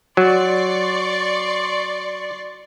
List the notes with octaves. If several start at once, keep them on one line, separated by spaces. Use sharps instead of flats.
F#3 D5 C6 C#6